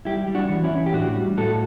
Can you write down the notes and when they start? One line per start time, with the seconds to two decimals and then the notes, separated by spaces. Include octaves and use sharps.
0.05 G3 E4 G4
0.28 G3
0.35 D4 F#4
0.50 E3
0.64 C#4 E4
0.71 E3
0.86 G4
0.93 A2 D4 F#4
1.16 G3
1.37 A2 F#4 A4